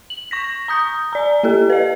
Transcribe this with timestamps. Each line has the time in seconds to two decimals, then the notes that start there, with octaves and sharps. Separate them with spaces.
0.10 F#7
0.31 C#6 A#6 B6
0.68 A#5 D#6 G6
1.13 D5 A#5
1.43 A#3 G4 A4
1.70 B4 D#5